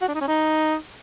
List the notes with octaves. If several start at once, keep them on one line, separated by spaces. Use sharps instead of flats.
F#4
D4
D#4
C#4
D#4